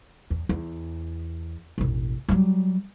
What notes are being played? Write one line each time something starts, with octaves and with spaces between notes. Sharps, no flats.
E2
E2
E1 A1
F#3 G3